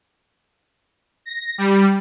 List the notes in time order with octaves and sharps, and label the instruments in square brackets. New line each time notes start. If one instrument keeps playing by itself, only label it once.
[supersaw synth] A#6
G3